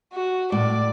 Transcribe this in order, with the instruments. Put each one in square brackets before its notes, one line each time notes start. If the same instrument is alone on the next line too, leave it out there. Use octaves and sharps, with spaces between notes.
[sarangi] F#4
[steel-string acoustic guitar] A2 [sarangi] D5